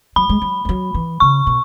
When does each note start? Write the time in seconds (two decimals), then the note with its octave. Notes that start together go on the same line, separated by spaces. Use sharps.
0.16 F#3 B5
0.29 G#3
0.42 F#3
0.65 G#3
0.69 F#3
0.94 E3
1.20 C#3 C#6
1.47 B2